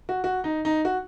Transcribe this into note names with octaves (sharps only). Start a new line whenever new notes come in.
F#4
F#4
D#4
D#4
F#4